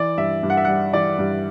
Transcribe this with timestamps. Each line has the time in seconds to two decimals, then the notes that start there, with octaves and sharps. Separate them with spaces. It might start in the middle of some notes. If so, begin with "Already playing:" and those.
Already playing: E3 D5
0.18 G2 E5
0.43 G2
0.50 F#5
0.57 E5
0.65 G3 F#5
0.94 E3 D5
1.19 G2